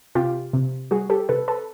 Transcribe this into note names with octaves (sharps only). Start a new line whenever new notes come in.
C3 F4 G4
C3
G3 F#4 G#4
G4 A4
C3 A4 B4
A4 B4